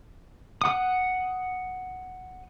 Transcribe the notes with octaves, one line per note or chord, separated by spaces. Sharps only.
F#5 D#6